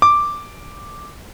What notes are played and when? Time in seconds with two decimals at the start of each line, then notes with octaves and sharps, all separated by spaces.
0.02 D6